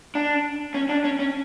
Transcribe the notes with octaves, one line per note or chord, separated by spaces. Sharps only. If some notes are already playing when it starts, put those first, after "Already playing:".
D4
C#4
D4
C#4
C#4